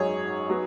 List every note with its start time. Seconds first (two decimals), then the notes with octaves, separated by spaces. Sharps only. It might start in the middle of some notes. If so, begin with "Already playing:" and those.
Already playing: G#1 F#2 F#3 D#4 G#4 C#5
0.50 F#3 B3